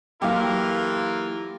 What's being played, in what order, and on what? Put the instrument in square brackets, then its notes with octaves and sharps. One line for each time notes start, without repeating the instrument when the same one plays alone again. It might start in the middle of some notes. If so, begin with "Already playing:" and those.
[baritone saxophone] E3 [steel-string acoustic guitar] F#3 A#3 A4 [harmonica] F4 A#4 [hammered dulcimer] G4 F5